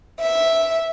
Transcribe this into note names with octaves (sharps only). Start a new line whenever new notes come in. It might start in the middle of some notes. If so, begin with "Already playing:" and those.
E5